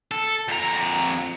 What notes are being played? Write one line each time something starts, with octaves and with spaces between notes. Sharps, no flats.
A4
F2 A#5